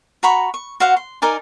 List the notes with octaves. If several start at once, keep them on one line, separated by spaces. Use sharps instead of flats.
F#4 A#5 B5 C#6
C#6
F#4 C5 F5 F#5
C6
D#4 A#4 D5 G#5